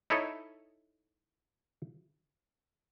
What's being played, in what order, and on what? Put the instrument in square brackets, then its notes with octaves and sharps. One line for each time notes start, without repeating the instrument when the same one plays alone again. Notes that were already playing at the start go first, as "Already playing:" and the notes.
[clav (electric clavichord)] D#4 E4 A4 C#5 D#5